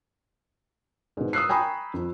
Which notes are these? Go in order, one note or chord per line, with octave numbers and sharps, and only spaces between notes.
G#2 B2
D#6 E6 F#6 C7
G5 G#5 A#5 B5 C#6 D#6
F2